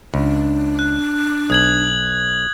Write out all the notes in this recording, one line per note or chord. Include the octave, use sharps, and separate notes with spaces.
C#2 D4
F#6
B1 D#6 G#6 F#7